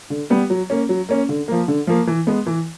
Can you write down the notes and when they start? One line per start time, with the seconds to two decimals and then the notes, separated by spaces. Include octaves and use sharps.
0.10 D3
0.30 G3 B3
0.50 F#3
0.70 A#3 C#4
0.89 F#3
1.09 A#3 C#4
1.29 D3
1.48 F3 A#3
1.68 D3
1.87 F3 A#3
2.07 E3
2.27 G#3 B3
2.46 E3